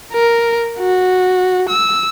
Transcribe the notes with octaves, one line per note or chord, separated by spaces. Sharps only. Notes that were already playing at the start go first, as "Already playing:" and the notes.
A#4
F#4
E6